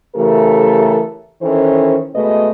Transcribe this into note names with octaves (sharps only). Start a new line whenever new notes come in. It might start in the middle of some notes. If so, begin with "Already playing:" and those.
C#3 E3 A3 G4 A4 A#4
D#3 E3 C#4 A4 C5
B2 G#3 A3 B4 D#5